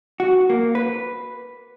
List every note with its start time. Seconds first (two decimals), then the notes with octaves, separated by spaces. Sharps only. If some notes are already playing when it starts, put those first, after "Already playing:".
0.20 F#4
0.50 A#3
0.75 B4